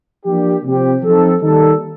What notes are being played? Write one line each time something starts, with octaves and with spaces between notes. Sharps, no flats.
F3 A#3 D4 G4
C3 F3 C4 G4
F3 C4 D#4 A4
D#3 G3 A#3 D#4 A4